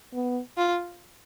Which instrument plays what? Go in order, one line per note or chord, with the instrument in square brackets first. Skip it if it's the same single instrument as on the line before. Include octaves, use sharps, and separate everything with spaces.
[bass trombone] B3
[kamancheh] F4